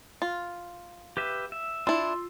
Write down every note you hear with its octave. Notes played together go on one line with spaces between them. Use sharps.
F4
G4 B4 E5
E5
D4 E4 F4 C6 E6